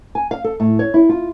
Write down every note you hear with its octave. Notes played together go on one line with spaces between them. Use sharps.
G#5
F5
A4
A2
C#5
E4
F4